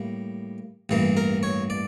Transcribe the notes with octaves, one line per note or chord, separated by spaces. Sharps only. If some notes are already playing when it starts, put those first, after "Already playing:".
Already playing: A2 G3 A#3
A1 G2 E3 A#3
A#4
C#5
D5